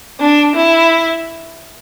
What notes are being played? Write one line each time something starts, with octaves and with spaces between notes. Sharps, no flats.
D4
E4